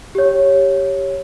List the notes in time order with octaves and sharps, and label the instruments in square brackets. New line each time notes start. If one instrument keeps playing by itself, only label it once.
[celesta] G4 C#5